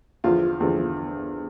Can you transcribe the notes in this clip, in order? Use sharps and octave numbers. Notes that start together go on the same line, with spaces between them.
E2 D3 F3 F4
E2 D3 F3